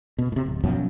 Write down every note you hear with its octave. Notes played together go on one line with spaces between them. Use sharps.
B2
A2 C3
D1
F#2 B2 F3 F#3